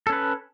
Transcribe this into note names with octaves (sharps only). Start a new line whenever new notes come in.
C#4 A4 B4